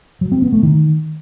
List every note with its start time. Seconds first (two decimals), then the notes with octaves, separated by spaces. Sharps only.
0.21 F#3
0.32 C4
0.42 B3
0.52 A3
0.63 D#3